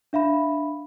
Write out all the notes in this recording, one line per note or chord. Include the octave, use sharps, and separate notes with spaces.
D4 E5 F5 B5